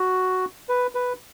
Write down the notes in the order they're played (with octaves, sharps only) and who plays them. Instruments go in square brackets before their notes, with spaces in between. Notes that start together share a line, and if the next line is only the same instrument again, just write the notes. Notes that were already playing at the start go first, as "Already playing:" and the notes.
Already playing: [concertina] F#4
B4
B4